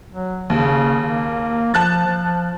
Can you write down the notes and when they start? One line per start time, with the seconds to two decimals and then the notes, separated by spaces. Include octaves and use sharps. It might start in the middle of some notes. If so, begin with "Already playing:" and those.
0.12 F#3
0.50 D#2 C#3
1.02 A#3
1.74 F3 A5 F#6 A6
2.06 F3